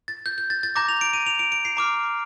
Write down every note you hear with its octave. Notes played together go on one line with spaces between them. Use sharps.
A6
G6
G6
A6
A6
A#5 D6 G6 A#6
F7
D7
D#7
F7
D7
D7
C7
A#5 D6 F6